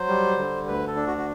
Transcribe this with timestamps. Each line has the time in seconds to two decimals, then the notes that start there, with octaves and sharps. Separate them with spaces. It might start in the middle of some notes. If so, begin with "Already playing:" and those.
Already playing: F#3 C5
0.08 G3
0.38 D3
0.68 D2 B4
0.87 A4
0.96 D4
1.07 F#4
1.17 F#4